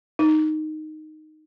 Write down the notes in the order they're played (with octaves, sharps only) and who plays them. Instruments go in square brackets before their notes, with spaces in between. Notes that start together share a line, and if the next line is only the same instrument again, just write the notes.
[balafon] D#4